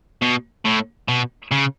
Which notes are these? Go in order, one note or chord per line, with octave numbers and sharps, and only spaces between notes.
B2
A2
B2
C#3